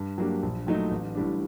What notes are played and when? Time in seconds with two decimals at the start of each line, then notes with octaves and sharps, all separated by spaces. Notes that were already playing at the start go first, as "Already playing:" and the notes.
Already playing: G2
0.18 F#3 A#3 D4 G4
0.43 A#1
0.67 A#2 F#3 A3 D#4
0.91 A1
1.15 A2 G3 D4